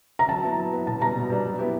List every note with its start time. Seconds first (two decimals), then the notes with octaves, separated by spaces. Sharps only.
0.19 A#5
0.29 F#3 A5
0.43 B3 E4
0.59 F#3
0.73 B3 E4
0.87 B2 A5
1.01 G3 B3 D4 A#5
1.15 B2
1.30 G3 B3 D4
1.45 F#3
1.59 B3 E4 G4